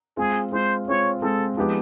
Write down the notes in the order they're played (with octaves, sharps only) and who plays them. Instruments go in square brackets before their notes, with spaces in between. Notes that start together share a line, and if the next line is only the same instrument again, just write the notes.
[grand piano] G#3 C4 F4 [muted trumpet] G#4
[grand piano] G#3 C4 F4 [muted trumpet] C5
[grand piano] G#3 C4 F4 [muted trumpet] C#5
[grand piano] G#3 C4 F4 [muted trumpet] A4
[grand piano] F3 G#3 B3 D#4 G4